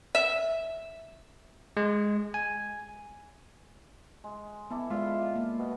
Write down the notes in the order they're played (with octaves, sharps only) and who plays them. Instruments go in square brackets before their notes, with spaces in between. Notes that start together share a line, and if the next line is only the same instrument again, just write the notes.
[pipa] E5
[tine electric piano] G#3
G#5
[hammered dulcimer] G#3
[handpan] B3 [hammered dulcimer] E4 A4 D5
[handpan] G#3 D5 [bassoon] F4 [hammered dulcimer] E5
[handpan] A#3
[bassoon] B2